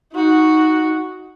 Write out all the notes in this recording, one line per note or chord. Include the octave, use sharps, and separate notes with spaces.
D#4 F#4